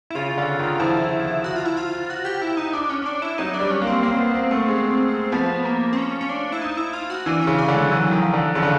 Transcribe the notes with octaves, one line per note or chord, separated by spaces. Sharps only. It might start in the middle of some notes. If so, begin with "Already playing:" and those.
E4
C#3 F4
D3
D#3
F3 E4
F#4
F4
E4
F4
F#4
G4
E4
D#4
D4
C#4
C#4
D4
E4
F#3 D#4
D4
G3
C#4
A#3
C4
A#3
B3
A#3
A3
G#3
F3 B3
A#3
C4
C#4
C#4
D4
E4
D#4
E4
F4
F#4
E3 D4
C#4
C#3
D4
D3
G#3
E3 F#3
D#3 F#3
F3
D3
C#3 F3
D3